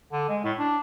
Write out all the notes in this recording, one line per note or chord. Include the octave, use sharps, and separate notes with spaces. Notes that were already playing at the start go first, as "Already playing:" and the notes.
D3
G#3
A2
D4